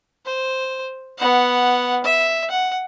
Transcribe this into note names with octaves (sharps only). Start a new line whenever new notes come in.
C5
B3 F#5
E5
F#5